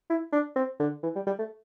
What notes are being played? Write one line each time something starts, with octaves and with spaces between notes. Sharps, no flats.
E4
D4
C4
D3
E3
G3
G3
A3